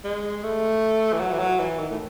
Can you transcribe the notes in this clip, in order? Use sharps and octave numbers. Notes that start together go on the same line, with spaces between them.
G#3
A3
E3
F#3
E3
F#3
E3
D#3
A2